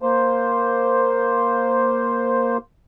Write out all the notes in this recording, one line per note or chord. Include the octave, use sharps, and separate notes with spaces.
A#3 C5